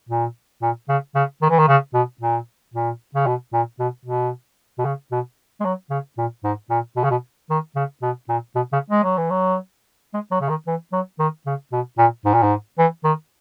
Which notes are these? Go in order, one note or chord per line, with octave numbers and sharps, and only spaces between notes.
A#2
A#2
C#3
C#3
D#3
E3
D#3
C#3
B2
A#2
A#2
C#3
B2
A#2
B2
B2
B2
C#3
B2
G#3
F#3
C#3
A#2
G#2
A#2
B2
C#3
B2
D#3
C#3
B2
A#2
B2
C#3
G#3
F#3
E3
F#3
G#3
F#3
C#3
D#3
E3
F#3
D#3
C#3
B2
A#2
G#2
A#2
G#2
E3
D#3